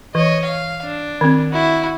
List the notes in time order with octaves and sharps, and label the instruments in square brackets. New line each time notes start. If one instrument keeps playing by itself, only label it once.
[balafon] E3 [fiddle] C#5 D#5
[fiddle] F5
D4
[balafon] D#3 C4
[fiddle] E4 F#4